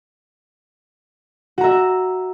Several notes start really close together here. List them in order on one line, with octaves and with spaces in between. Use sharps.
F#4 A#5 E5